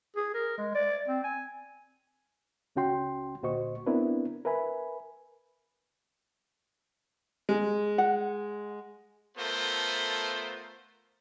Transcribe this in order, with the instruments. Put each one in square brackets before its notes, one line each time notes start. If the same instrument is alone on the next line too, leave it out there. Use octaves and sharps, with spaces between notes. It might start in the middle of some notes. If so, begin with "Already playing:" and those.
[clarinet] G#4
A#4
G#3
D5
C4
G#5
[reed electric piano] C#2 C#3 C#4 F#4 G5 C6
D2 A#2 F#4 C5 D#5 C#6
B3 C4 D4 E4 A#4 B4
A#4 B4 E5 G#5 B5
[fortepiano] G#3
[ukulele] F#5
[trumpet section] A3 B3 F4 A4 A#4 C5